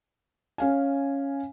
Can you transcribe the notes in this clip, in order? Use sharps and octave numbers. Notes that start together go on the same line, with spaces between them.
C#4 F5 G#5